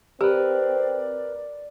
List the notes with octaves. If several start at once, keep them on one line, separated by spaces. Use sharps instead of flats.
C4 G4 A#4 B4 D5